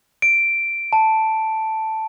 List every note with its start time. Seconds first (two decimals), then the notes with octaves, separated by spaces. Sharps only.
0.22 D7
0.93 A5